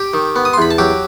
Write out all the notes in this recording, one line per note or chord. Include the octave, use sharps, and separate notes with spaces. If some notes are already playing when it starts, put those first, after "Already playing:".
Already playing: G4 G5
D#3
B3
D#6
C6
E2 B5
A5
F#3 G4 G5